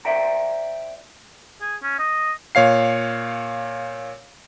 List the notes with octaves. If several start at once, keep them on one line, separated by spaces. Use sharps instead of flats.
C5 D5 E5 G5 A#5
G#4
C#4
D#5
A#2 C#5 F5 C7